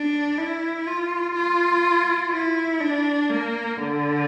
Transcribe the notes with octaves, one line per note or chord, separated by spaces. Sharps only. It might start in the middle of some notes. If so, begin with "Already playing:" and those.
Already playing: D4
E4
F4
F4
E4
D4
A#3
D3